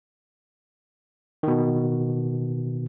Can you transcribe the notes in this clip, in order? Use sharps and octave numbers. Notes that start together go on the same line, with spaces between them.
B2 D#3